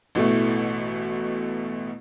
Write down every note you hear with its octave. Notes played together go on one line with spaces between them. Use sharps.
A1 B2 E3 A3